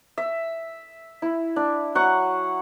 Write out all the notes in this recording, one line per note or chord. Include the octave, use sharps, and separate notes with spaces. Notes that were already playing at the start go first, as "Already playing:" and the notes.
E5
E4
D4
F#3 F#5 C#6